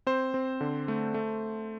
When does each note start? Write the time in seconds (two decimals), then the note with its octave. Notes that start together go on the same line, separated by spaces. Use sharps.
0.07 C4 C5
0.34 C4
0.61 D3
0.88 A3
1.14 A3